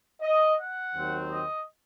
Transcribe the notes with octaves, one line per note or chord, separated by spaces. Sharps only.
D#5
F#5
D#2 D#3 F#3 C4
D#5